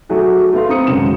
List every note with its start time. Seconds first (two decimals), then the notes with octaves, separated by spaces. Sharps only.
0.09 F#3 A3 F#4 G#4
0.53 A3 B3 F5 C6
0.69 C4 A#5 D#6 C#7
0.87 G#1 C#2 F#2 C#3 D4 E7